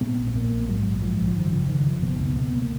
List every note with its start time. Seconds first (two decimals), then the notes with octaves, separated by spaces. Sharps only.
0.01 A#2 B3
0.18 A#1
0.27 B3
0.35 A#2 A#3
0.52 A#1
0.68 G#2 F#3
0.85 A#1
1.02 G#2 F3
1.19 A#1
1.28 F3
1.35 F#1 D#3
1.46 F#3
1.52 C#3 F3
1.69 F#2 D#3
1.86 F#1 F3
2.02 B2 B3
2.20 C#2 B3
2.36 B2 B3
2.53 C#2 A#3